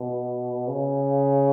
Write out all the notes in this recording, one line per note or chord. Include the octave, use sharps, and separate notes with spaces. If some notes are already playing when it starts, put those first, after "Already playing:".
Already playing: B2
C#3